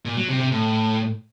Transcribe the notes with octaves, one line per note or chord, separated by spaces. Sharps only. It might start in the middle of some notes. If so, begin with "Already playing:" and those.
A#2
F#3
C3
C3
A2